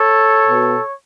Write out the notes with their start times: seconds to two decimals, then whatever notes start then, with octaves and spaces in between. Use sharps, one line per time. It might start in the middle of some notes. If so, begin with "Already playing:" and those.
Already playing: A4 C#5
0.47 B2 B3